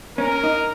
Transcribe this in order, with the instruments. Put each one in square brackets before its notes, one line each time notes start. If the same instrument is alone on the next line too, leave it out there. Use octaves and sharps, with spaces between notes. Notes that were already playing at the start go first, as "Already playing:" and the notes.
[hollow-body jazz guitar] C#4 [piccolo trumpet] A#4
[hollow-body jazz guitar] D#4